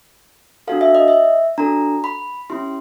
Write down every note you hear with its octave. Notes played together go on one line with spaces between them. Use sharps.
D4 F#4 A4 F5
E5
D#5
E5
D4 F#4 A4 A#5
B5
C#4 E4 G4 C6